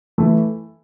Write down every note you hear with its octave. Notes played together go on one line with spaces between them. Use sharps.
E3 A3